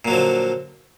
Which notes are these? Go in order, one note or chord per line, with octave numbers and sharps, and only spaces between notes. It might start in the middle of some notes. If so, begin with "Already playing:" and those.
A#2 D3 F3 F#3